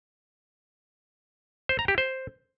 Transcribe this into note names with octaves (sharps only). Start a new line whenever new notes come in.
C5
A#5
G4
C5